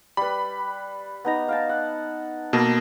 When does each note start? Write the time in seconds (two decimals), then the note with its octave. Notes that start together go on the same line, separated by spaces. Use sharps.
0.17 G3 B4 B5
1.25 B3 D#4 A#5
1.48 F5 G5 A5
1.69 F#5
2.53 B2 A#3 A4